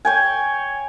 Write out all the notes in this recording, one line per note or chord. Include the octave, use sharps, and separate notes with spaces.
C#5 G5 G#5